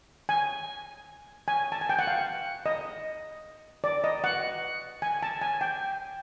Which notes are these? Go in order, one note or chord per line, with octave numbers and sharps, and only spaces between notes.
G#5
G#5
A5
G#5
G5
F#5
F5
D#5
D5
D#5
F#5
G#5
A5
G#5
G5